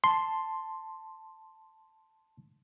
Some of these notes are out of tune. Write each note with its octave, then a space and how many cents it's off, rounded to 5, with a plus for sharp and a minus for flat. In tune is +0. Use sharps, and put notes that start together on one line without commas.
A5 +0 C6 +0